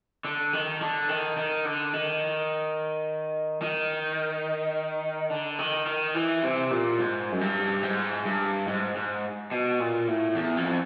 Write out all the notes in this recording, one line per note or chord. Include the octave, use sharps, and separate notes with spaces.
D3
D#3
D3
D#3
D#3
D3
D#3
D#3
D3
D#3
D#3
E3
C3
A#2
G#2
F#2
G2
G#2
G2
G#2
G#2
B2
A#2
A2
E2
F2